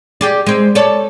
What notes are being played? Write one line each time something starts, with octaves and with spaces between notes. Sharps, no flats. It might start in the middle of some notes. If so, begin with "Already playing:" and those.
G4 G#4 D5
G#3 C4
A4 C#5 D5